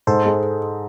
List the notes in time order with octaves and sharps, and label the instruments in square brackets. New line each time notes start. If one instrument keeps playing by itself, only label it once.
[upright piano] G#2 [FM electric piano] A4 C5
[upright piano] G#3